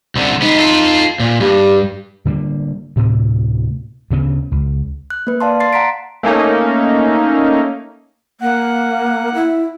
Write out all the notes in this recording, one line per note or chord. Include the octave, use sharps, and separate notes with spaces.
C2 D3
G#3 B3 D#4
F4 A4
A#2
G2 G4
D3 G3 G#3 A#3
D2 A2 C3
D2 C#3 B3
C#2
F#6
A#3 B4
D5 F5 A5 C6
C6 A6 C7
F#5 A#5 C6 B6 D7
A3 A#3 C#4 D#4
A#3 F#5
E4